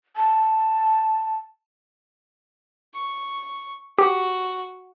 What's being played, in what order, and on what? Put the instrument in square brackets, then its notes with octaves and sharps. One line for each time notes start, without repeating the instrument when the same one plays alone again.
[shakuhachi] A5
[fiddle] C#6
[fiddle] F#4 [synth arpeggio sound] G4